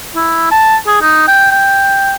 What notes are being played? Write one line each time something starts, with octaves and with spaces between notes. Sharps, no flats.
E4
A5
G#4
D#4
G5
G5